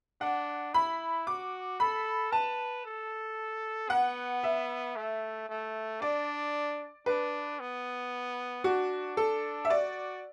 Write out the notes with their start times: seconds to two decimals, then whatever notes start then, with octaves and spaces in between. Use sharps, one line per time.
0.21 D4 F#5
0.74 E4 B5
1.27 F#4 D6
1.80 A4 B5
2.32 B4 A5
2.85 A4
3.90 B3 F#5
4.43 E5
4.96 A3
5.49 A3
6.01 D4 D5
7.06 D4 B4
7.60 B3
8.64 D4 F#4
9.17 A4
9.65 E5
9.70 F#4 D5